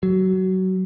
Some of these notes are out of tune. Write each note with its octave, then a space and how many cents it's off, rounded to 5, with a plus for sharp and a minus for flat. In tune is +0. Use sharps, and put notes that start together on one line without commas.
F#3 +20